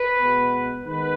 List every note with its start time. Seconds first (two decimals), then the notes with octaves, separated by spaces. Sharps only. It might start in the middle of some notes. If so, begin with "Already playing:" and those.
Already playing: B4
0.18 B2 G#3 B3
0.84 D#3 G#3 B3 B4